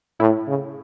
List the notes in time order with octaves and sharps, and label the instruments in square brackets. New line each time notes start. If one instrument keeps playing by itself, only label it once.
[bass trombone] A2 [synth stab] E4
[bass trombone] C#3